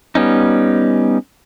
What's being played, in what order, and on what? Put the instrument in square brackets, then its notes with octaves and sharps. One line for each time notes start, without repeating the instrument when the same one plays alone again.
[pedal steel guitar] G3 B3 C#4 D#4